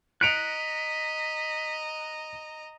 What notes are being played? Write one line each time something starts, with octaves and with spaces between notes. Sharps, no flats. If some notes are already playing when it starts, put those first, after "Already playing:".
D#5 A#5 F#6 B6 C#7 D7 F7